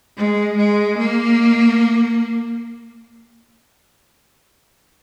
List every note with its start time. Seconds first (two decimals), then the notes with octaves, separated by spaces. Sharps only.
0.18 G#3
0.58 G#3
0.98 A#3